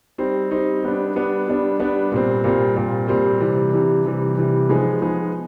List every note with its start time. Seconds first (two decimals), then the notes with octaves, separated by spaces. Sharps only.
0.18 G3 C4 D#4
0.51 G3 C4 D#4
0.83 G3 B3 D4
1.15 G3 B3 D4
1.48 G3 B3 D4
1.79 G3 B3 D4
2.12 A#2 G3 C4
2.44 A#2 G3 C4
2.76 A#2 G3 C4
3.08 A#2 G3 C4
3.41 C3 E3 G3
3.73 C3 E3 G3
4.05 C3 E3 G3
4.38 C3 E3 G3
4.69 F3 G#3 B3 D#4 G#4
5.02 F3 G#3 B3 D#4 G#4